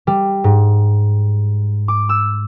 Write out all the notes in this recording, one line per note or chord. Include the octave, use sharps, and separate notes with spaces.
G3
G#2
D6
E6